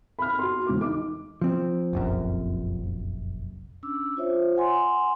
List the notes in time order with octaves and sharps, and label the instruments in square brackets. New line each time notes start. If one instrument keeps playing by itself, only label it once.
[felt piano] B5 F6
F#4 C6
E1 D6
D#4 D6
[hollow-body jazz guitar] F3 C4
[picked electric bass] F1 A#1 F#2
[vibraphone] C#4 D4 D6 E6
F4 C5 C#5 E5
F#5 G#5 C6